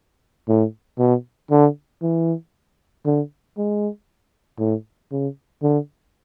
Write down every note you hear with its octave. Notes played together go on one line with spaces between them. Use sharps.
A2
B2
D3
E3
D3
G#3
A2
C#3
D3